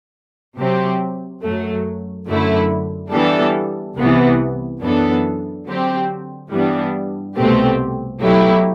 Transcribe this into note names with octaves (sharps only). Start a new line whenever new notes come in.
C3 F#3 C4 G4
F#2 F#3 A3
F#2 D3 A3 E4
E3 G3 B3 D4 A4
C2 C3 E3 B3
F#2 E3 B3 D4 A4
D3 F#3 C4 G4
G2 E3 G3 B3 D4
C2 B2 A3 C4 G4
B2 F#3 A3 E4 G4